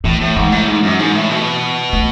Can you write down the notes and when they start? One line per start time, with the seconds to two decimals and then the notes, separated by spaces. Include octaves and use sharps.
0.04 A2 E3
0.21 A2
0.36 G#2 E3
0.52 A2
0.68 G#2
0.83 F#2
0.99 G#2
1.15 A2
1.31 B2
1.93 A3